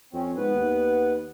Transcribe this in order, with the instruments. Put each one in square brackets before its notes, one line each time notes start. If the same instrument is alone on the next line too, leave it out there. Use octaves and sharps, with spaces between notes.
[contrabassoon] F2 [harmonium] C4 C#4
[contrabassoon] G#2 [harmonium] B3 B4
[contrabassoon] D#2